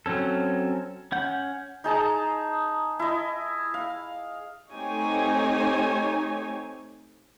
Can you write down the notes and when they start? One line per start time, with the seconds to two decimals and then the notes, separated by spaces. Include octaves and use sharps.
0.06 F#3 C4 C#4 A4
1.12 C#4 F#5 G6
1.84 D#4 G#4 A5 A#5
2.99 E4 D#5
3.74 F5
4.73 A3 C4 D#4 G4 C#5 G#5